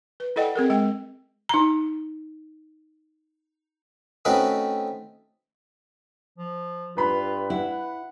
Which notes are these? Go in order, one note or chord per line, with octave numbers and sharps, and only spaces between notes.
B4
E4 A4 D5 D#5 F#5 G5
C4 G#4 A#4
G#3 G5
D#4 A#5
A3 C4 C#4 D#4 F#4 B4
F3
G2 F4 B4 B5
E4 F#5